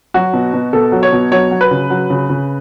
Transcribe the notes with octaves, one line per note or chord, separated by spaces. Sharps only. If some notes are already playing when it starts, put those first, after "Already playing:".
F#3 F#4
B2
B2
B2 A4
F#3
C#5
B2
F#3 C#5
F#3
B4
C#3
F#3
C#3
C#3